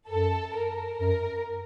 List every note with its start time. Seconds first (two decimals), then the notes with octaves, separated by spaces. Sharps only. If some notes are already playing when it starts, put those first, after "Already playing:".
0.09 F#2 A4
0.54 A#4
0.99 F#2 A#4